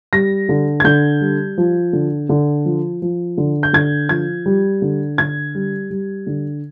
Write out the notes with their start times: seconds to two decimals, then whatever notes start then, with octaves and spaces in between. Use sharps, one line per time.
0.13 G3 A#6
0.49 D3
0.80 G#6
0.84 D3 G6
1.21 G3
1.58 F3
1.93 D3
2.29 D3
2.65 F3
3.02 F3
3.38 D3
3.63 G6
3.73 D3 G#6
4.09 F3 G#6
4.46 G3
4.82 D3
5.18 D3 G#6
5.55 G3
5.90 G3
6.27 D3